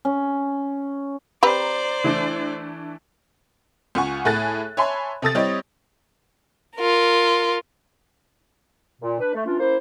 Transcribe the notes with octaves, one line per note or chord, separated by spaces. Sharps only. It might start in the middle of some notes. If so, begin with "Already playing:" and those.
C#4
C4 G4 B4 C5 D5 A#5
E3 A3 D4
C#2 F4 F#5 G#5 C#6
A2 G#4 A4 F#6 A6
C#5 E5 G#5 A5 B5 C6
C3 A4 D#6 A6
G3 C4 E4 G4 C#5 D#5
F4 A#4
A#2
D4 B4
A3
E3 C#4 D4 F4
A#3 C#4 E4 C5